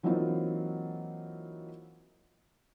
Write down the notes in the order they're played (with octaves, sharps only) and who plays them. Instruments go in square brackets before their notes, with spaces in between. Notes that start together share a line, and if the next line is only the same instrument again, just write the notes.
[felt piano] E3 F#3 A#3 C4 D#4 F4